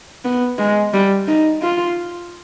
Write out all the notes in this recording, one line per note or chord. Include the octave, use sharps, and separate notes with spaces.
B3
G#3
G3
D#4
F4